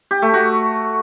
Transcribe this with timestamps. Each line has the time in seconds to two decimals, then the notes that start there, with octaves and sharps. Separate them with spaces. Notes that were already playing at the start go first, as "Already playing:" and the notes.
0.11 G4
0.22 A3
0.34 F#4